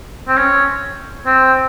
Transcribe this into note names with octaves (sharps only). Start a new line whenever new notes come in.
C4
C#4
C4